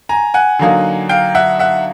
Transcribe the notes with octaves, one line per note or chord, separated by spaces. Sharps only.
G#5 A#5
F#5 G#5
D3 F#3 A#3 D#4
F5 G5
E5 F#5
E5 F#5